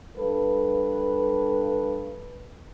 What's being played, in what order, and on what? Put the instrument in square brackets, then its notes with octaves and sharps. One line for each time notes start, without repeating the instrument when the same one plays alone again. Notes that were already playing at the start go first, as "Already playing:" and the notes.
[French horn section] G2 A4 B4